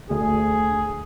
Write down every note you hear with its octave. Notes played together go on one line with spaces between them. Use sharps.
D2 G#4